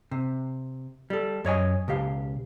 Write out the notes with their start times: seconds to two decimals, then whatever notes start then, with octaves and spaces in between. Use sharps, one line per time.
0.11 C3
1.10 G3 A4
1.45 F#2 C#5 D#5 G#5
1.88 C#2 B2 G4 F5